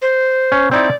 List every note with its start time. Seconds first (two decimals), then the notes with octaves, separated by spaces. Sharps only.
0.02 C5
0.52 C#4
0.71 C4 D#4 E4 D5